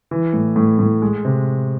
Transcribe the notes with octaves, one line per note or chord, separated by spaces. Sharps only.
E3
A2
A2
A2
G#3
C3